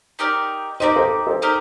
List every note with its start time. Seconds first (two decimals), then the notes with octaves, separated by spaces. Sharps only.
0.19 D#4 G4 A#4 D5
0.80 D#4 G4 A#4 C5 D5 D#5
0.96 A4 C5
1.27 A4 C5
1.42 D#4 G4 A#4 D5